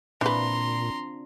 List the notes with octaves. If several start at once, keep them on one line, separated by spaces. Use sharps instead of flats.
A#2 E3 C4 D4 F4 B4 A#5 C6